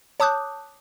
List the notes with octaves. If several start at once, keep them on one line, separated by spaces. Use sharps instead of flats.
C#5 A5 D6 D#6 F#6 G6